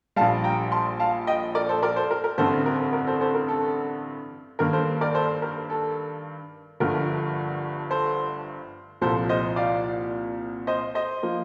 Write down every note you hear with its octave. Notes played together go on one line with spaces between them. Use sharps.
A#1 A#2 G3 F5 A5
G5 A#5
A5 C6
F5 A5
D#5 G5
A#4 D5
A4 C5
A#4 D5
A4 C5
A#4
A#4
A1 G2 D3 A3 C4 A4 C5
A#4
A#4
A4 C5
A4 C5
A#4
A4
G2 D#3 A#3 A#4
A4 C5
A#4 D5
A4 C5
A#4
A4
G1 G2 D3 F3 A3 A#4
A4 C5
C2 A#2 F3 A4 C5
C5 D#5
D5 F5
C5 D#5
C5 D#5
F3 A#3